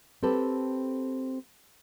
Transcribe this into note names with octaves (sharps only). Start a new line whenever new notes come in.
C4 G4 A4 B4